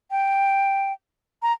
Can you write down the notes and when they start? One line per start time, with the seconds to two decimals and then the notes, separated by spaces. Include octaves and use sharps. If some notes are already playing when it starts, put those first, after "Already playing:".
0.11 G5
1.42 A#5